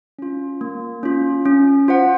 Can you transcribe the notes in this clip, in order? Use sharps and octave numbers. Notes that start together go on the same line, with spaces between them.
C#4 F4
A#3
C#4 F4
C#4
F4 C5 F#5